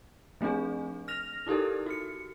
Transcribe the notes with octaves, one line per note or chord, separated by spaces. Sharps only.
F3 A3 C4 D4 G#4
F6 A#6 F7
D#4 E4 G4 A4 A#4
F#4 C#7